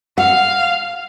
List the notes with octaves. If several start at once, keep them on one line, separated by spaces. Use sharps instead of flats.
F5 F#5